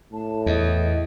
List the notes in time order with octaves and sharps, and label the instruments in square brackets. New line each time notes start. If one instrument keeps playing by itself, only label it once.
[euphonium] A2 [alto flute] A5
[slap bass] E2 [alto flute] D#5